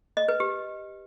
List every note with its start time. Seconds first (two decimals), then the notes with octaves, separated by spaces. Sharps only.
0.17 D#5
0.28 B4
0.40 G4